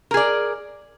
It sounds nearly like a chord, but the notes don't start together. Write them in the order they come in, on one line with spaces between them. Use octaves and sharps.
A#4 G#4 D5